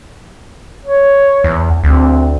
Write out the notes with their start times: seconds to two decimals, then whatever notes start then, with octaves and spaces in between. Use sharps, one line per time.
0.85 C#5
1.44 E2
1.84 D2 C4